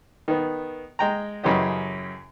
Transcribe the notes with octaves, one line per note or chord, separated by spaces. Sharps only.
D#3 B3
G#3 G5 A#5
F#2 C#3 E3 C#4 G4 D#5